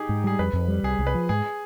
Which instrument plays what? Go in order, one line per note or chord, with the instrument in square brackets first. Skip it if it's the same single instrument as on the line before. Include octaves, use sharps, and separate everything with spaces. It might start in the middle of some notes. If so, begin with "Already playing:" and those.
Already playing: [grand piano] D#4 G4 G#4
[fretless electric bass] G#2
[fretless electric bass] G3 [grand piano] G#4
[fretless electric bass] F2 [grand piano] B4
[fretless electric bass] F2
G3
[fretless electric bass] C2 [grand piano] G#4
[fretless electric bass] C2
[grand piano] B4
[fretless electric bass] F3
[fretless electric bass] G#2 [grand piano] G#4